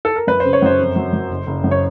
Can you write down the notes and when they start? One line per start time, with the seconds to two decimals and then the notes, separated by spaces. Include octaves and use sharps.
0.05 A4
0.16 A#4
0.27 F#2 B4
0.40 C#3 C5
0.53 C#5
0.62 F#2 C5
0.79 F2
0.96 F#3
1.13 F#3
1.30 F#1
1.47 F#1
1.64 F#2
1.71 C#5